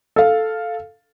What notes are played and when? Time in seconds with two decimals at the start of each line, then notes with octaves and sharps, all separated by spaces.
0.16 A4 F5